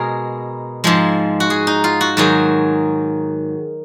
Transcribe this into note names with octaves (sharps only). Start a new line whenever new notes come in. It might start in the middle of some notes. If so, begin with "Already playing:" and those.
Already playing: B2 G#3 G#4 A#4
G#2 F3 G#3
F#4
G#4
D#4
F4
F#4
G#2 D#3 F#3 G#4